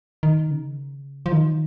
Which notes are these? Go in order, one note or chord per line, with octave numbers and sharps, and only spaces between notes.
D#3
C#3
F3
D#3